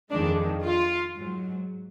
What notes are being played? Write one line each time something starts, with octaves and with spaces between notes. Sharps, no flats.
F2 D#3 G#3 D4
F4
G#2 F#3